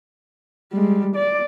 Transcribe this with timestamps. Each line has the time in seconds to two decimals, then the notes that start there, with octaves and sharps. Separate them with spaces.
0.72 G3 G#3
1.15 D5